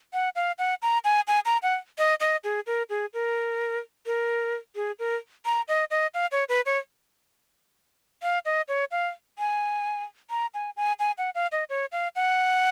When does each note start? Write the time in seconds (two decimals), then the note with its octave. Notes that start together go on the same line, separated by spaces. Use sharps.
0.13 F#5
0.36 F5
0.58 F#5
0.82 A#5
1.05 G#5
1.28 G#5
1.46 A#5
1.63 F#5
1.98 D#5
2.20 D#5
2.44 G#4
2.67 A#4
2.90 G#4
3.14 A#4
4.06 A#4
4.76 G#4
4.99 A#4
5.45 A#5
5.68 D#5
5.91 D#5
6.14 F5
6.32 C#5
6.49 B4
6.66 C#5
8.23 F5
8.45 D#5
8.68 C#5
8.91 F5
9.39 G#5
10.30 A#5
10.54 G#5
10.77 G#5
10.99 G#5
11.18 F#5
11.35 F5
11.52 D#5
11.69 C#5
11.92 F5
12.16 F#5